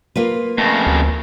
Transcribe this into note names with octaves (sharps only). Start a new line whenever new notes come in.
A#3 F4 B4
F2 C#3 A3
D2